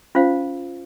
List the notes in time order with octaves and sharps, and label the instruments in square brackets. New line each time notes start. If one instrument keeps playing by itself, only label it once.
[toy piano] C#4 F4 C5 F5